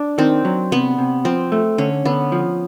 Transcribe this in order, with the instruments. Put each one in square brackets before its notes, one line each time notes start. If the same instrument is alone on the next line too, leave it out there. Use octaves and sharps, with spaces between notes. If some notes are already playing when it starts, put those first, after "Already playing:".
Already playing: [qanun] D4
[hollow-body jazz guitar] D#3 [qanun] C4
[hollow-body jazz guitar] F#3
[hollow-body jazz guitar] C3 [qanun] B3
[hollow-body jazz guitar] C3
[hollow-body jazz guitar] F3 [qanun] C4
[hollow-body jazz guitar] A3
[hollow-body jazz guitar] D3 [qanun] C#4
[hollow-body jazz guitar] D3 [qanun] B3
[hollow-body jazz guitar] F3